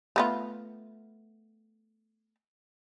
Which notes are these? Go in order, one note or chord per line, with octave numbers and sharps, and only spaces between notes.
A3 B3 F4